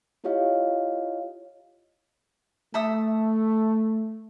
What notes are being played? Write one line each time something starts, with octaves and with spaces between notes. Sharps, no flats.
E4 F4 G4 C#5 D#5 F5
A3 A4 E5 D#6